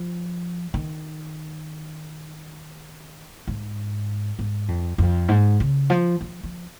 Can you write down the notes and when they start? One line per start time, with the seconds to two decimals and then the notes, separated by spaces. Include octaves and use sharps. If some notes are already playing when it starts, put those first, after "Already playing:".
Already playing: F3
0.74 D#3
3.47 G#2
4.39 G#2
4.68 F2
4.98 F2
5.28 G#2
5.60 C#3
5.90 F3
6.21 F3
6.43 F3